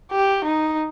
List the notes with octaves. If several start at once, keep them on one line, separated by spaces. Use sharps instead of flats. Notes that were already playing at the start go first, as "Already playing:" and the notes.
G4
D#4